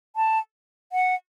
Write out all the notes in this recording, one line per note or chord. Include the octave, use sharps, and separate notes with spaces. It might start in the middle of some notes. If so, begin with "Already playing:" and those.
A5
F#5